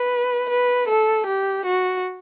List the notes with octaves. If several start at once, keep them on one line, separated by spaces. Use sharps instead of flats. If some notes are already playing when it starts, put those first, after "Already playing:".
Already playing: B4
B4
A4
G4
F#4